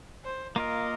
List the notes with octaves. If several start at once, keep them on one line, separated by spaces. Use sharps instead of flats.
C5
A#3 F4 A#4 D#5